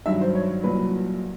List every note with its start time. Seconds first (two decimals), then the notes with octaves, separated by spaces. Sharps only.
0.06 G2 D#3 F#3 E5
0.21 C5
0.35 C#5
0.63 C2 A#2 F#3 B4